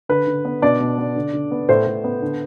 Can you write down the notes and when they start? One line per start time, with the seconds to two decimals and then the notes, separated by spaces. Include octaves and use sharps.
0.09 D3 B4
0.27 D3
0.45 B3
0.62 B2 D4 D5
0.80 B2
0.98 B3
1.16 D3
1.33 D3
1.51 B3
1.69 A2 C5
1.87 A2
2.04 B3
2.22 D3